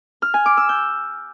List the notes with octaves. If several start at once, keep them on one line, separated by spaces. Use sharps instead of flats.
F6
G#5
D6
E6
G6